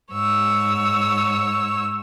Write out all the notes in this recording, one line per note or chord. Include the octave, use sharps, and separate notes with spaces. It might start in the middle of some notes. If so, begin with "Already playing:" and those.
G#2 C#5 E6